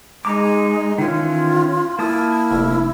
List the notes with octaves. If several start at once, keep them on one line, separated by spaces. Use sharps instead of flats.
G#3 D#4 A#5 D6
D#3 E3 C#4 F4
A#3 E4 A5 D#6
F1